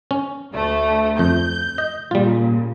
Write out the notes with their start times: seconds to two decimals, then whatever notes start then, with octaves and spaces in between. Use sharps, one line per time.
0.11 C#4
0.54 D2 A3
1.19 F2 G6
1.78 D#5
2.11 A#2 C#3 G3 F4